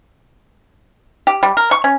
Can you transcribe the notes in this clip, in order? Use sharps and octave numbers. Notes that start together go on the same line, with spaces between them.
G4
G3
A#4
C#6
C#4